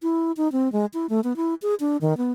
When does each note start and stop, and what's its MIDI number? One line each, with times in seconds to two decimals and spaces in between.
0.02 0.32 64
0.37 0.51 63
0.52 0.71 60
0.72 0.86 56
0.94 1.06 64
1.09 1.20 57
1.24 1.36 59
1.36 1.54 64
1.62 1.75 68
1.80 1.97 62
2.01 2.17 51
2.17 2.32 59